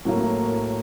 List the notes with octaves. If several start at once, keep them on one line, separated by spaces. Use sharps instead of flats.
A2 F#3 A#3